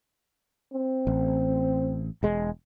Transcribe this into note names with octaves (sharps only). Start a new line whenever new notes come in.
C4
A1
E1 G#3